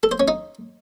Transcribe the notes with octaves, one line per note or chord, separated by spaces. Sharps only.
A4
C5
C#4
D#4